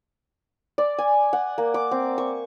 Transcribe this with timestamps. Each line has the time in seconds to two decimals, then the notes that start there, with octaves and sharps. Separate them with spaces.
0.78 D5
0.99 G#5
1.33 F#5
1.58 A#3
1.74 D6
1.91 C4
2.18 C#6